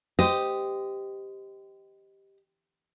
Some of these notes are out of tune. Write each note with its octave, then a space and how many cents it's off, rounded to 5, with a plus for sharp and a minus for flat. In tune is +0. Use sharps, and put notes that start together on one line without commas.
G4 +0 C5 -30 D#5 +0